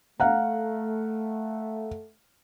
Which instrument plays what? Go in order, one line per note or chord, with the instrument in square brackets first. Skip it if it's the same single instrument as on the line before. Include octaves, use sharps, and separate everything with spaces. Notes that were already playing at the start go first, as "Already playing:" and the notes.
[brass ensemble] A3 [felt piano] F5 F#5 A#5